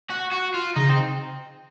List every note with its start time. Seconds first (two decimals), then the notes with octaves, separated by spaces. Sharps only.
0.10 F#4
0.32 F#4
0.54 F4
0.76 C#3 D#4
0.89 C4